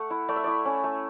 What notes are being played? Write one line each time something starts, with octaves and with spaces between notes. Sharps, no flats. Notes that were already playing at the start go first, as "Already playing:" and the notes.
Already playing: A3 F#5
E4
A3 D5
E5
E4 D5
C#4
A3